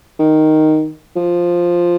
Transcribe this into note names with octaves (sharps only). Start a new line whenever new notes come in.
D#3
F3